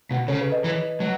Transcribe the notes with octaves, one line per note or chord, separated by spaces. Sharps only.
B2
C#3 A4 C#5
G#4 B4
B4 D#5
E3
F#3